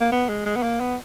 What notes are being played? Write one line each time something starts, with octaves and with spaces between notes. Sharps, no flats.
A#3
B3
G#3
G#3
B3
A#3
B3